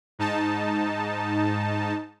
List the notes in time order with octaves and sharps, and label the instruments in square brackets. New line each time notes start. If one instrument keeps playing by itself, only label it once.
[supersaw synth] G#2 D#4 A5